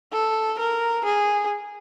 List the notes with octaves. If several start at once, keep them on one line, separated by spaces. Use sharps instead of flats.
A4
A#4
G#4